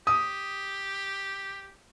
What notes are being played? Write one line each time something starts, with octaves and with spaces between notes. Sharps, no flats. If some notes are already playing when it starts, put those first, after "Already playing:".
G4 D#6